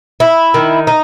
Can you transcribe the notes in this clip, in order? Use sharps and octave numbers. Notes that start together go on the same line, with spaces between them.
E4
D#3
D#4